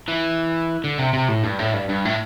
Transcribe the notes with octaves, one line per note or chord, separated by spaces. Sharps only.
E3
D3
C3
C3
A2
G2
A2
G2
G2
A2